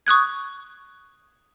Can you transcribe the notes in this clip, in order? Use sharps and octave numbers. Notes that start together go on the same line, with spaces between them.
C#6 D#6 F#6 G#6